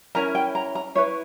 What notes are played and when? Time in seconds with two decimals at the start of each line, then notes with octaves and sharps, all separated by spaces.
0.15 C#4 E4 A#4 A#5
0.35 G5
0.55 A#5
0.75 A#5
0.95 E4 B4 C#5